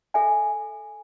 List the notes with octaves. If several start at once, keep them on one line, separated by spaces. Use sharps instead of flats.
A4 E5 G#5